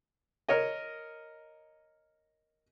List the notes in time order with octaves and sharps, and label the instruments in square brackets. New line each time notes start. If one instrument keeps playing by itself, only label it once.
[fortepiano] A#4 C#5 D#5